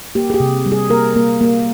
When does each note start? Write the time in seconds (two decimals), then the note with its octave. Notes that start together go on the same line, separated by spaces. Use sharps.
0.15 A#3 G4
0.30 G#4
0.34 G4
0.40 C3
0.66 G3
0.72 G#4
0.90 A#3 A#4
1.16 A#3
1.41 A#3